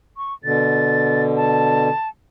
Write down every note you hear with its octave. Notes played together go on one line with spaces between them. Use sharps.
C#6
B2 D3 A6
A5